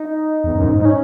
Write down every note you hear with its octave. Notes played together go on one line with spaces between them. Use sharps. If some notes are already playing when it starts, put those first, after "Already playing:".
Already playing: D#4
E2
F#2
G#2
G#2
D#4
C#4